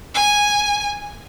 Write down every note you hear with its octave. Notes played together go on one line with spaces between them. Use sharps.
G#5